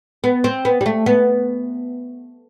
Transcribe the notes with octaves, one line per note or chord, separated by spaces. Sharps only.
B3
C4
B3
G3
A3
B3